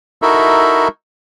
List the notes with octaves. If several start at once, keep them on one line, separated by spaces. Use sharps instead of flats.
D#4 E4 F#4 A4 A#4 E5